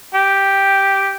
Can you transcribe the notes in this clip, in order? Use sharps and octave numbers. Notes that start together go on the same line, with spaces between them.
G4